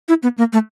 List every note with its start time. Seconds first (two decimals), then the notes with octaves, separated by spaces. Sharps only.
0.09 E4
0.23 B3
0.38 A#3
0.53 A3